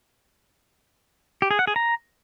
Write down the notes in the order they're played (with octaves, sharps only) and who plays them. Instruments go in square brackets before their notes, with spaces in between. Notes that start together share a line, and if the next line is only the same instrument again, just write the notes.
[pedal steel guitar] G4
G#4
F#5
G#4
A#5